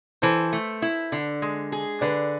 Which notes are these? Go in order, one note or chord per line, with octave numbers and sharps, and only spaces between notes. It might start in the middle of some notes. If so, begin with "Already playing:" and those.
E3 A4 C5
A3
E4
D3
G#3
G#4
D3 B4 D5